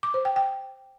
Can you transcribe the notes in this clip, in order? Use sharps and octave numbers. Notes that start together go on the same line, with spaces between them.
D6
C5
G5
G5